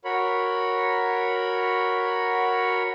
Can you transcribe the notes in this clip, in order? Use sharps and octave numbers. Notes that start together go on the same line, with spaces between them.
F#4 A#4 C#5 B5